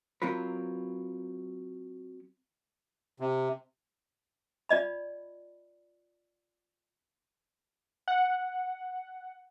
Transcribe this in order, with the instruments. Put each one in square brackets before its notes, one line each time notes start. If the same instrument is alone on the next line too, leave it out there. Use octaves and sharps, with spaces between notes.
[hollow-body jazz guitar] F#3 C4 F4 A#4 B4
[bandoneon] C3
[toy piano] F4 D5 D#5 B5
[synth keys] F#5